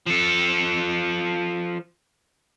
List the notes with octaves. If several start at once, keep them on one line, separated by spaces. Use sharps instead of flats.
F3 A4